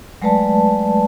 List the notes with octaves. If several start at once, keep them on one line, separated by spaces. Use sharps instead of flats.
F#3 G#3 A3 B4 D5 A5